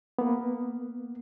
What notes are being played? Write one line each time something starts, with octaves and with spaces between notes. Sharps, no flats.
A#3 B3